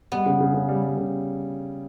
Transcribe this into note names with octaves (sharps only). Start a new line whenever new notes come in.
G3 B3
C#3
C#3
C#3
G3
G3
C#3